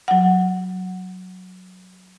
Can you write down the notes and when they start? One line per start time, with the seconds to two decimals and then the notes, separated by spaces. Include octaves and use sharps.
0.08 F#3 F#5